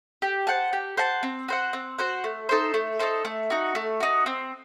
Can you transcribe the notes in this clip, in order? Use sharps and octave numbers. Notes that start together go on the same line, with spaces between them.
G4
C5 F#5 A5
G4
C5 F#5 A5
C4
F#4 C5 F#5
C4
F#4 C5 F#5
A3
D#4 A4 C5
A3
D#4 A4 C5
A3
D#4 F#4
A3
D#4 F#4
C4